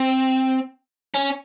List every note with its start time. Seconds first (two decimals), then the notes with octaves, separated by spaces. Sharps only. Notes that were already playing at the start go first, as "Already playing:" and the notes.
Already playing: C4
1.15 C#4